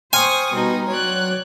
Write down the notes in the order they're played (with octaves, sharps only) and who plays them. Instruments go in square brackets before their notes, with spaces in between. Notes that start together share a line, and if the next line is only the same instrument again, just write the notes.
[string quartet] C5 C#6 D#6 [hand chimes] G5 C6 F6 [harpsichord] G#5
[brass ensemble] B2 [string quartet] G3 D#4
[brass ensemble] F#3 [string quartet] C#5 D5 F#6